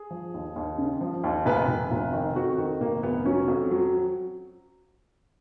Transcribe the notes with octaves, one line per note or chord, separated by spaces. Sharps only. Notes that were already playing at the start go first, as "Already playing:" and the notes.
Already playing: G#4
F3
D#2
D#2
C#3
F3
D#2
F1 B4
F1
F1
D#3
F2 F#4
D#3
F1 A#3
F1 B3
F#3 C#4
F2
F#3